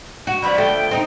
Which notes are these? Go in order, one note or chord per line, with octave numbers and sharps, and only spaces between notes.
F#4
D3 F3 B3 B5
A3 G5
C4 D#4